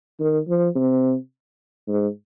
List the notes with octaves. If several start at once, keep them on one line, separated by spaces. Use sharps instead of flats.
D#3
F3
C3
G#2